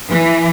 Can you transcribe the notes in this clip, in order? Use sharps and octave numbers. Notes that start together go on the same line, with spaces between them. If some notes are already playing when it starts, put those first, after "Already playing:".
E3